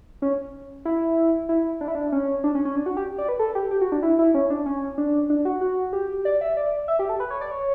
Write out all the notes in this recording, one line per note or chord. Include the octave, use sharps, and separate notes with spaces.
C#4
E4
E4
D4
E4
D4
C#4
D4
C#4
C#4
D4
F#4
G4
D5
B4
A4
G4
G4
F#4
D4
E4
E4
C#4
D4
C#4
D4
D4
F#4
F#4
G4
D5
E5
D5
E5
G4
A4
B4
C#5
D5
C#5